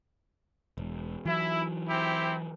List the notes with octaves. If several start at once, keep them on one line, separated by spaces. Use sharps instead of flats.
E1
E3 F#3 E4
C4 E4 G4